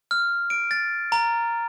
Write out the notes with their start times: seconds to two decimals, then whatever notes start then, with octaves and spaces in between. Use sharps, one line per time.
0.11 F6
0.50 D7
0.71 A6
1.12 A#5